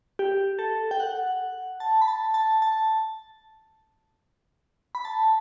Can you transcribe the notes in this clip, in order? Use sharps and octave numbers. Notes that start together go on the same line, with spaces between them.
G4
A4
G5
F#5
A5
B5
A5
A5
A5
B5
A5